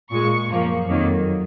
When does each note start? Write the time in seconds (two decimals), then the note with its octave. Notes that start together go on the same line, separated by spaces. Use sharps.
0.11 A#2 G#3 C#6
0.49 F#2 F3 A#3
0.88 F2 D#3 F#3 A#3